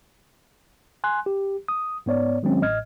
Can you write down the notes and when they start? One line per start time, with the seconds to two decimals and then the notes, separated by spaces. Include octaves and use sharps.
1.04 G#5 C6 F#6
1.26 G4
1.68 D#6
2.06 G#2 B3 C#5 D5
2.43 D#3 F#3 G#3 C4 C#4
2.61 A1 A2 D#5 F6 G#6